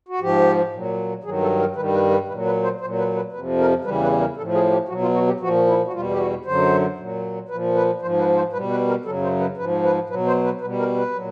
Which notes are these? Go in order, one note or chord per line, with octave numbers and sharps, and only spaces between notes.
F#4
G#2 F3 G4
A#2 F#3
G2 D#3 F#3 G#4
A4
A#4
G2 D#3 G3 B4
B4
B4
A#2 F#3 B4
B4
C5
A#2 F#3 C5
B4
B4
F2 C3 F3 B4
A#4
E2 C#3 E3 G3 B4
B4
A#4
A2 F3 A4
G#4
G4
B2 F#3 F#4
F4
F#4
G4
A#2 F3 F#4
E4
F#4
E2 B2 G3 F4
G4
F#4
F#2 D3 F#3 C5
A#2 F#3
A#2 F3 B4
B4
G#2 F3 C5
B4
C5
B2 G3 B4
B4
A#4
F#2 C#3 F#3 A4
C5
B4
G#2 F3 B4
B4
B2 F#3 B4
C5
B4
B2 G3 B4
A#4
B4
A#2 F#3